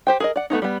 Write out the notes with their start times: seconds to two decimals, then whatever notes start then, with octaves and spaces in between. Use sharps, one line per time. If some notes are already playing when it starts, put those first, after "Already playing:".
0.07 G4 C5 G5
0.20 G#4 A#4 D#5
0.36 D5 F#5
0.50 A3 B3 C#4 D#4
0.62 G3 B3